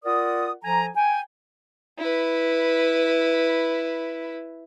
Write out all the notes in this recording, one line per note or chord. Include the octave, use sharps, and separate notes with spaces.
F4 A#4 D5 F#5 D#6
F3 A4 G#5 A#5
G5 G#5
E4 B4